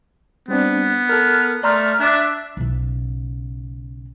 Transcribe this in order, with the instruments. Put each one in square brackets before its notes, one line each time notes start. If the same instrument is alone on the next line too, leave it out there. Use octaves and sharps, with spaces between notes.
[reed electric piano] G3 C4 D4 [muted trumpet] B3
[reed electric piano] A4 A#4 [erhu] F6
[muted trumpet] A3 [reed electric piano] D5 A#5 C6 [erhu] F6
[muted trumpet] D4 [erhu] E5 [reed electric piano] D6 F#6
[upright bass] B1 C#3